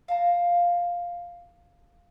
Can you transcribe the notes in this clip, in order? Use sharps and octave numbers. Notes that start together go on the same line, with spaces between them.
F5 A5 A#5